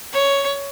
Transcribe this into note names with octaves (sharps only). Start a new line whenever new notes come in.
C#5